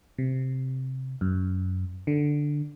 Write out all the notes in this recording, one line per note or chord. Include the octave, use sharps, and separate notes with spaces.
C3
F#2
D3